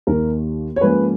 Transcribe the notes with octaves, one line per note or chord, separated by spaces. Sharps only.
D#2 D#3 A#3 A#4
C#5
G#2 F3 A#3 C#4 B4